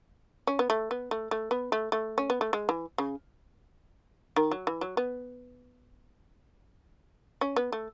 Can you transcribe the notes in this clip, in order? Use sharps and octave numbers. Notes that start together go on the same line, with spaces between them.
C#4
B3
A3
B3
A3
A3
B3
A3
A3
C#4
B3
A3
G#3
E3
C#3
D#3
F#3
E3
F#3
B3
C#4
B3
A3